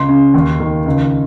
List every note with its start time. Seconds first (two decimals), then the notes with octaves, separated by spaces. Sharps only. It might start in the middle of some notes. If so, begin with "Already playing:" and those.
Already playing: C#2 C6
0.08 C#3
0.34 D#2
0.60 D#3
0.86 C#2